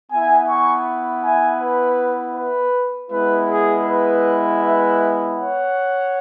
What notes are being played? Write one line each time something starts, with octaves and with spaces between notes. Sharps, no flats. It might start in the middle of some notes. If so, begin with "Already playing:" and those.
B3 E4 E5 G#5
G#5 C#6
E5 G#5
B4
B4
G#3 B3 E4 B4
G#4
B4
B4 E5
C#5 F#5